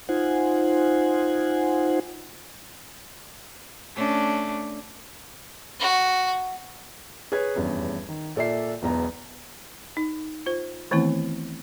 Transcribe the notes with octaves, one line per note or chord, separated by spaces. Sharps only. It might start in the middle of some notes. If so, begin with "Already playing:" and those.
D#4 F4 C5 F#5 G#5
A3 C#4 D4
F#4
G#4 B4 C#5 G#6
F1 E2 G2 C#4
D#3
A#2 A4 D5 E5 C7
E1 B1 E2 B3 A#5
D#4
F4 C5
D#3 E3 A3 B3 C4 E4